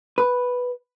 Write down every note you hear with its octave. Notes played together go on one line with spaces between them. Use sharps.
B4